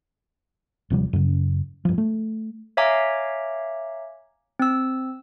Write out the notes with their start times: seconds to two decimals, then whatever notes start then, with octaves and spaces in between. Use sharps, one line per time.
0.90 D#1 C3 F3 G3
1.13 F#2 C#3
1.85 G2 F3
1.98 A3
2.77 C#5 E5 F5 G#5 A#5 D6
4.59 C4 E6